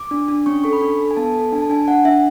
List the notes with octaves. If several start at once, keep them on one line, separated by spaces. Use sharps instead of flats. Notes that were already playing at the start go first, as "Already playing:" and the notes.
Already playing: D6
D4
D4
C#4 C#6
A4 C#6
B5
D4
A4
G#5
B3 A5
A4
D4 G#5
A5
D4 G#5
D4 F#5
D4 E5